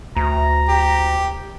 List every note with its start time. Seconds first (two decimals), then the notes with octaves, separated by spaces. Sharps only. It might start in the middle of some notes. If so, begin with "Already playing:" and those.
0.17 D2 A#5
0.68 G4